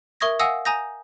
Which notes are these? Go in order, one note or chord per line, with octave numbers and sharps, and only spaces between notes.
A#4 E5 C#6 D#6 G#6 A#6
F5 F#5 G#5 D#6 E6 A#6
G#5 A#5 D#6 G6 A#6